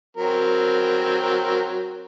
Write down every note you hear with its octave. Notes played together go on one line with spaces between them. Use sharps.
F#3 C4 A#4